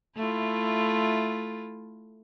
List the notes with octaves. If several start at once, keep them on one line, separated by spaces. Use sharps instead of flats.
A3 E4 F4